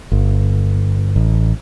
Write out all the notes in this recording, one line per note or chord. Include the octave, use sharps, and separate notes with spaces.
G1
A1